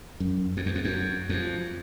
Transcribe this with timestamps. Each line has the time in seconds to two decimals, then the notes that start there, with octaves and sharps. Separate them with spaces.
0.20 F#2
0.57 F2
0.66 E2
0.75 F2
0.85 F#2
1.29 F2